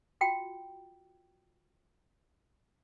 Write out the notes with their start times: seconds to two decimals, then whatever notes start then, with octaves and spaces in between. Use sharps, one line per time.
0.21 F4 F#4 G5